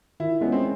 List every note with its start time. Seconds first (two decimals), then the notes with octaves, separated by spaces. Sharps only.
0.20 D#3 E4
0.41 G#3 B3 C#4
0.52 C4